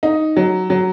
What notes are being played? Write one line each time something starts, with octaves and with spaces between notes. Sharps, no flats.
D#4
F#3
F#3